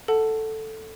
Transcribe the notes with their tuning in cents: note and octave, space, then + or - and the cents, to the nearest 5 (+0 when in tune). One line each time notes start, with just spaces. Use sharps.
A4 +0 F#5 +0 A5 +0